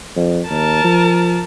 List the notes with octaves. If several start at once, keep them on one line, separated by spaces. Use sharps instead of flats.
F2
D#2 A#4 A5
F3